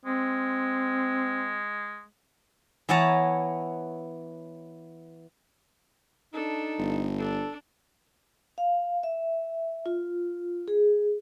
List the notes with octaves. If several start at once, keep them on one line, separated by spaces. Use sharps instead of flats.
G#3 C4
E3 B3 C#5 F#5 A5 A#5
D4 D#4 A4
G1
D4 A4
F5
E5
F4
G#4